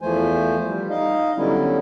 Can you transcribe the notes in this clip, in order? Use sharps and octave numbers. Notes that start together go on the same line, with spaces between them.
E2 E3 F3 A3 C5 G#5
G3
D#4 D#5 F5
D3 F#3 G3 B3 C#4 E4